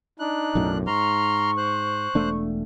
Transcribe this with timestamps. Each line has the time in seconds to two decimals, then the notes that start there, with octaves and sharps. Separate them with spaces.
0.20 D4 D#4 F#6
0.55 B1 F#2 A2
0.87 G#2 A#5 C6 C#6 F6
1.57 C5 F#6
2.15 E1 A3 D4